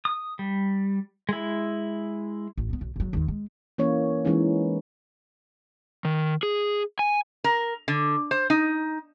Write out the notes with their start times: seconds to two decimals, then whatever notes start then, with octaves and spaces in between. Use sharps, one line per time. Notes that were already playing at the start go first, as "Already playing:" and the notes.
0.05 D#6
0.39 G3
1.29 G#3 E4
2.58 A1
2.70 D3 B3
2.81 B1
2.96 F#1 F#3
3.13 D#1 D#2
3.28 G#3
3.78 E3 A#3 C#4 C#5
4.25 E3 G#3 C#4 D#4
6.05 D#3
6.43 G#4
6.99 G#5
7.44 A#4
7.88 D3
8.31 C5
8.50 D#4